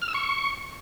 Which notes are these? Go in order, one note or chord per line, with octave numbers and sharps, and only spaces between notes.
F6
E6
C#6